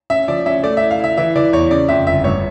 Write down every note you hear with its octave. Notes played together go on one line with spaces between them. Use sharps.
C#4 E5
F3 D5
C#4 E5
A3 D5
E4 E5
F5
E4 E5
E3 E5
E3 D5
E2 C#5
C#3 D5
F2 E5
G1 E5
G2 C#5